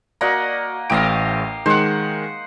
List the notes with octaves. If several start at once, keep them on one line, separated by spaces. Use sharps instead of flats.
A#3 F#4 D5 D#5 F#5 A#5
A1 A2 G4 D#5 F5 D7
D#3 G#3 C5 F#5